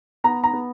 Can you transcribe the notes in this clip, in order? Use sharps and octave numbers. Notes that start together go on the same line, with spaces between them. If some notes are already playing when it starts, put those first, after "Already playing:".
B3 A#5
A#5
B3